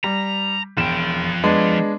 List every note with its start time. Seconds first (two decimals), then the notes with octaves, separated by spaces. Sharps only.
0.04 G3 A#5
0.77 E1 F3 G5 E7
1.44 G#3 B3 D4